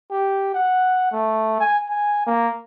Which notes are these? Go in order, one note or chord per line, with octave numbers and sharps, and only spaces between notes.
G4
F#5
A3
G#5
G#5
A#3